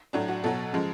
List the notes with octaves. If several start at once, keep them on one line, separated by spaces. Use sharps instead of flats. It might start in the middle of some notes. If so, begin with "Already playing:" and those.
A2 F#3 D4
F#4
B2 F#3 A4
C#3 F3 G#3